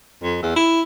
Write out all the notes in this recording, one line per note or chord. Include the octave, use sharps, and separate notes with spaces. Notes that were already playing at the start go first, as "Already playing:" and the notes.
F2
E2
E4